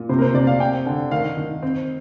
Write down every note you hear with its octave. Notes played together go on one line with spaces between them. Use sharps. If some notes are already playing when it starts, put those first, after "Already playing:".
Already playing: A#2
C3 C5
A#4
C5
C3 D5
F5
C4 G5
D3
D#3 F5
D#3
C4